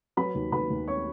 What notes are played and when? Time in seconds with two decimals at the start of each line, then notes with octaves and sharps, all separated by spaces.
0.17 F#3 B4 B5
0.35 D#2
0.52 D#2 B4 B5
0.70 D#2
0.88 C#5 C#6